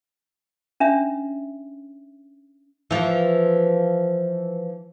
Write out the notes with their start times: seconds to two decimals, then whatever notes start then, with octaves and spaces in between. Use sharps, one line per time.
0.80 C#4 D4 E5
2.91 E3 F3